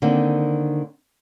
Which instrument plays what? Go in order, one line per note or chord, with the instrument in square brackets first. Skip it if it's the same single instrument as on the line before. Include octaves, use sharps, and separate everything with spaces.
[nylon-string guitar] D3 D#3 A#3 C4